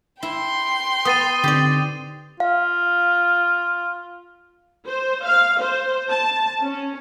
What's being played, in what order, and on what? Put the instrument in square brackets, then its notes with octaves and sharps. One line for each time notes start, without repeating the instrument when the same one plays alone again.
[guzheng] E4 [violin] G5 C6
[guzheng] B3 [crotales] D#6 A6 D#7
[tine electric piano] D3 C4 D#4 [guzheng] G4 D5
[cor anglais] F4 [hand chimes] F5
[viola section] C5
F5
C5
A5
C#4